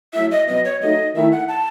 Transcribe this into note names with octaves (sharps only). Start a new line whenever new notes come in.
F#3 A3 E4 E5
D#5
B2 F#3 B3 D#5
C#5
F#3 A3 D#4 D#5
D#3 A3 E4 E5
F#5
A5